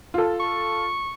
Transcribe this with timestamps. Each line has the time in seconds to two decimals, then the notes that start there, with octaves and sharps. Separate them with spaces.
0.14 F4 A4
0.40 C#6